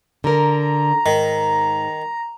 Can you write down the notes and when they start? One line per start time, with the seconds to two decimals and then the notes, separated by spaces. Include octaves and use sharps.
0.24 D3 A#4 A#5
1.06 G#2 D#3